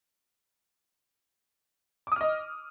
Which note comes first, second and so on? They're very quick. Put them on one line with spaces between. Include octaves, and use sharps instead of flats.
D6 D#6 F6 D#5